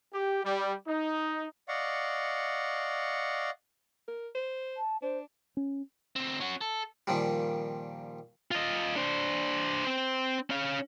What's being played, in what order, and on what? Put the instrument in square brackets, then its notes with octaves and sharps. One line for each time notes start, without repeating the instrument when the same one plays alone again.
[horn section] G4
G3
D#4
[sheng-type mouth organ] D5 D#5 F5 F#5 C#6
[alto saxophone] A#4
C5
[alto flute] A5
[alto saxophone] D4 [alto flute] C5
[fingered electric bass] C#4
[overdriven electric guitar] D2 C4
C#4 F#4
A4
[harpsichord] A#2 D#3 F3 G3
[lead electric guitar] F4 D#5
D4 C5
C4 C5
C#4 F5